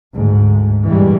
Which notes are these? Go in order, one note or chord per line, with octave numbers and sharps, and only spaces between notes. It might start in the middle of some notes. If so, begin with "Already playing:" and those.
D2 G#2
G2 A#2 E3 G3 G#3